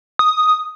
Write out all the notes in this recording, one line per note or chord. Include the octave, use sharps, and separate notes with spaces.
D#6